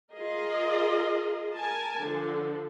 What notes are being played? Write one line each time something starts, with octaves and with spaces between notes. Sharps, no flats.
F4 G#4 A#4 D#5
A#4 G#5 A5
D3 F3 A4